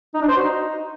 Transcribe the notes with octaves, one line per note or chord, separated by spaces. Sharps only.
D#4
D4
C5
F#4
D#4